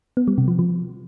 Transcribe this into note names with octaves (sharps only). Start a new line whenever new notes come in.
B3
G3
C3
F3
F3